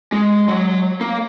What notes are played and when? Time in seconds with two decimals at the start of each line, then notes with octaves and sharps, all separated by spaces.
0.12 G#3
0.48 F#3
1.01 A#3